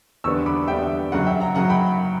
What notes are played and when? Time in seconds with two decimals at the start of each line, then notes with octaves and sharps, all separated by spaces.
0.24 E2 D3 G3 B3 C#6 E6
0.46 B5 D6
0.67 E2 D3 G3 B3 E5 G5
0.82 E5
1.12 F#2 C#3 F#3 F#5
1.26 E5 G5
1.40 F#5 A#5
1.55 F#2 C#3 F#3 F#5 A#5
1.70 G5 B5